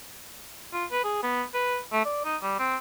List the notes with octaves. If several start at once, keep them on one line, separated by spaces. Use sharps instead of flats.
F4
B4
G#4
B3
B4
A3
D5
D#4
G3
C4